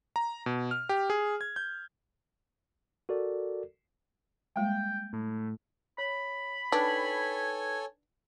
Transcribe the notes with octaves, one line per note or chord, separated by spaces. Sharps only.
A#5
B2
F6
G4
G#4
G#6
G6
F#4 A4 A#4 D5
G3 G#3 A#3 G5
A2
C#5 B5
D4 D#4 A4 B4 C#5 G5 G#5